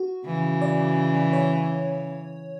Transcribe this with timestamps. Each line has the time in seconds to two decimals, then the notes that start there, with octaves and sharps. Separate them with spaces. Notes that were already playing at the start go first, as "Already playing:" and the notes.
Already playing: F#4
0.26 C#3 E3
0.62 D5
1.33 C#5